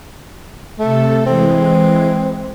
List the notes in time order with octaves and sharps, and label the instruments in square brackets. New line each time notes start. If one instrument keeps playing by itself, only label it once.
[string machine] C3 A4 [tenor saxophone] A3
[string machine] E3 G#3 [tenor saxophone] C4